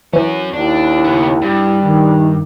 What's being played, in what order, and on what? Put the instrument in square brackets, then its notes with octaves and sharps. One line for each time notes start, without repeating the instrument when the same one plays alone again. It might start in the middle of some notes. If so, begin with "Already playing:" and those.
[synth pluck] E3 [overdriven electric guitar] C#4 F#4
[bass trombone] D#2 [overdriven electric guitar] D4 [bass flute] E4
[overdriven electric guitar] C#3 B3
[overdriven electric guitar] G2 [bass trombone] G3
[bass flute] D#3